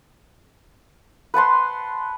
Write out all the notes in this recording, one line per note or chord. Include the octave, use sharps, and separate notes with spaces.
B4 F#5 A5 C6